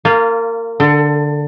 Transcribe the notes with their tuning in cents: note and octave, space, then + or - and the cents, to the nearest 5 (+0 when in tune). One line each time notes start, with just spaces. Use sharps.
A#3 -25 F4 +0
D3 +0 A4 +25